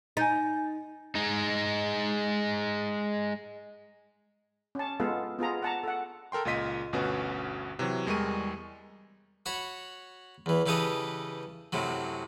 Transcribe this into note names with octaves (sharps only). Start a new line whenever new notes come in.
D#4 G#5 G6 A6
G#3 D#4
C#4 A5
G#3 B3 F4 A4 F5
B3 F4 G#4 A#5
F#5 A5 A#5
A4 F#5
A4 A#4 G5 C6
C#2 A#2 F4 D#5 B6 D#7
G1 D2 B2 C#4 F#4 B4
C3 E3 F#3
E2 G3 G#3 A#4 C#6 D#7
F#4 C#5 B5
E2 E3
C#3 E3 G4 A4 B4 D#5
F#2 A2 C3 F#3